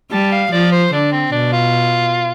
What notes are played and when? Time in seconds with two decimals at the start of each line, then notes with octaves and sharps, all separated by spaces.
0.12 G3 A5
0.32 F5
0.52 F3 D5
0.72 C5
0.93 D3 D4
1.12 C4
1.32 B2 D4
1.53 F4